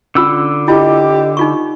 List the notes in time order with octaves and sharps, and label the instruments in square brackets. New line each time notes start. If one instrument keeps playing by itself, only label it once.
[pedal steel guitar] D3 E6 [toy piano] C#4 F4
[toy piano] E4 F4 [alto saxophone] G4 [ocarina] D#5
[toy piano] D#4 F4 C#6